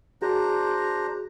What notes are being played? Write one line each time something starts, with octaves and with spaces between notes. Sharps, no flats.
D4 F#4 G#4 C5 A#5